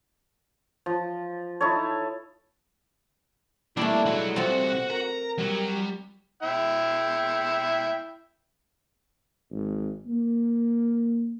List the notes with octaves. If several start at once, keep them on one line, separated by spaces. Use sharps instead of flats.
F3
D#4 E4 A4 C#5
C2 G3 A3 A#3 D4 E4
F#3 G#3 D4 F#4
C2 C4 F4 F#4 F#5
A#4 A#5
F#3 G3
E4 G5 E6
G#1
A#3